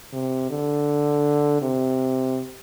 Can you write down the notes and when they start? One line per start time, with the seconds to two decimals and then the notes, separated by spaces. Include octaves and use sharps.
0.13 C3
0.50 D3
1.62 C3